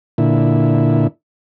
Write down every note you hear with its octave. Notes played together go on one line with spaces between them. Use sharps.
A#2 D3 E4